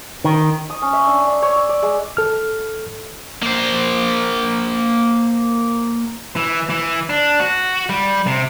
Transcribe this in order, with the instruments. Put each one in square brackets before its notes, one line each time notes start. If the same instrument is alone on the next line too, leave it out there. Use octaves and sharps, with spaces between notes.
[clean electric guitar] D#3
[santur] D#6
C#4
E5
D4
D4
C#5
E6
D5
G#3
[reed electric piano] A4 F6
[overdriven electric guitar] A#3 C5
[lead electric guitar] E3
E3
D4
F#4
G3
C3